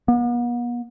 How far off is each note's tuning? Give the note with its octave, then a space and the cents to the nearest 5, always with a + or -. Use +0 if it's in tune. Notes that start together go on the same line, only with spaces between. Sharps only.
B3 -45